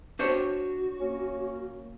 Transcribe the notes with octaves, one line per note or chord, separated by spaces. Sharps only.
D4 F#4 C5 C#5
A#3 C#4